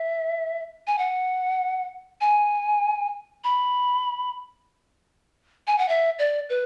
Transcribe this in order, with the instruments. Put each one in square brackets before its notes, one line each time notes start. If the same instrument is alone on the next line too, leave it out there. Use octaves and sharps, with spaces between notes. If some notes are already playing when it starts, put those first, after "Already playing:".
Already playing: [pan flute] E5
G#5
F#5
G#5
B5
G#5
F#5
E5
D5
B4